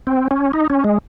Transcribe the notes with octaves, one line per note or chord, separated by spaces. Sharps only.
C4
C#4
D#4
C#4
G#3